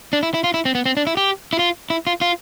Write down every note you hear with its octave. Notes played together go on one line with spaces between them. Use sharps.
D4
E4
E4
F4
E4
C4
B3
C4
D4
E4
G4
E4
F4
E4
F4
F4